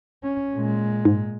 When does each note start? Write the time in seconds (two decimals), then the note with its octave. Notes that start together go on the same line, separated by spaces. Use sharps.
0.23 C#4
0.54 A#2 G#3
1.05 G#2